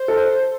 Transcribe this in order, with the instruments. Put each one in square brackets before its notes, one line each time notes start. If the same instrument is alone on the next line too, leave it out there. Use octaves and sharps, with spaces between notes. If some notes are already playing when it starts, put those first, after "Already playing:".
Already playing: [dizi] C5
[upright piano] A4